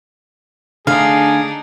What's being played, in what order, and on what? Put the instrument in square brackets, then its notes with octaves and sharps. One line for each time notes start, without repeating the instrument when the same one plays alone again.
[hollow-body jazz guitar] D3 A3 [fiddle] D4 D#4 [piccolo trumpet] G#4 [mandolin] F5